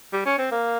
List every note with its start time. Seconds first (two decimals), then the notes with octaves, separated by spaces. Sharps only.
0.13 G3
0.26 C#4
0.38 C4
0.52 A#3